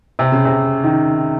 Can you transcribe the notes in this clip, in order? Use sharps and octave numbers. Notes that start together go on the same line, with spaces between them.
C3
C#3
C3
D#3